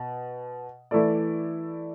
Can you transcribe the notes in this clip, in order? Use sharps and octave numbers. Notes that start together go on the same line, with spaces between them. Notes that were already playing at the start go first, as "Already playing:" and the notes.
Already playing: B2
E3 A3 E4 A4 D5